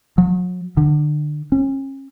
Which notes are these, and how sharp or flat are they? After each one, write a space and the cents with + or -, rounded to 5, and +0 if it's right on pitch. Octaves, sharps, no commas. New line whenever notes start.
F#3 -40
D3 +30
C#4 -35